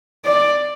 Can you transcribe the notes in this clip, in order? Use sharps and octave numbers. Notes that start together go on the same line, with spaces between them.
D5